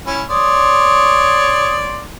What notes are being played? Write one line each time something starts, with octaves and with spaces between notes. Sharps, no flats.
C#4 E4
C#5 D5 C6 D#6